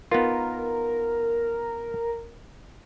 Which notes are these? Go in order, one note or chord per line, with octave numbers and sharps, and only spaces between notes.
B3 D#4 F4 A#4